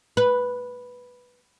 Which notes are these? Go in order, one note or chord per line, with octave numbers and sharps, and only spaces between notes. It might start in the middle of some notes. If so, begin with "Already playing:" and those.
B4